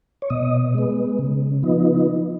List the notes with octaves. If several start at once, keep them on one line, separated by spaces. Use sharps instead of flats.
C#5
B2 D#5
G#3 B3
C#3
F3 B3 D#4